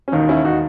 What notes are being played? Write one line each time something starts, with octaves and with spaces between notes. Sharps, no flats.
C#4
E1 D#2 D#3 D#4
C#4 E4
D#4 F#4